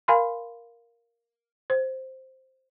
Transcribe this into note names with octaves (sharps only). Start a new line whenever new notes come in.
A#4 F5 G#5 B5 C6
C5